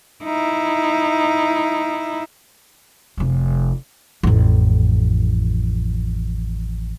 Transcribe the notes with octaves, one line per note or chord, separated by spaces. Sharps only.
D#4 E4
F1 F3
A1 F2